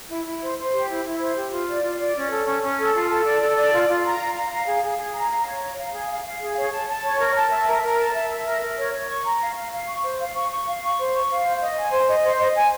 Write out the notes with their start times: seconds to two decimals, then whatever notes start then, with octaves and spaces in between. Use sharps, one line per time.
0.09 E4
0.25 E4
0.41 C5
0.57 C5
0.72 G4
0.88 E4
1.04 E4
1.19 C5
1.36 G4
1.51 F4
1.67 D5
1.82 F4
1.99 D5
2.14 C#4
2.30 A4
2.46 C#4
2.62 C#4
2.77 A4
2.94 F4
3.09 A4
3.24 D5
3.41 A4
3.56 D5
3.72 F4
3.88 F4
4.04 A#5
4.19 F5
4.35 A#5
4.50 F5
4.66 G#4
4.83 G#4
4.98 G#4
5.14 A#5
5.30 F5
5.46 C#5
5.61 A#5
5.77 F5
5.93 G#4
6.09 F5
6.24 F5
6.40 G#4
6.56 C#5
6.72 A5
6.88 A5
7.03 C#5
7.19 A#4
7.35 A5
7.50 E5
7.67 A#4
7.82 A#4
7.97 A5
8.13 E5
8.29 E5
8.45 A#4
8.61 A#4
8.77 C#5
8.92 C#5
9.08 C#6
9.24 A#5
9.40 F5
9.56 F5
9.72 F5
9.88 C#6
10.03 C5
10.19 F5
10.34 C#6
10.50 C#6
10.66 F5
10.82 C#6
10.98 C5
11.14 C#6
11.30 F5
11.44 C5
11.60 D#5
11.77 G#5
11.92 C5
12.08 D#5
12.24 C5
12.39 D#5
12.55 G#5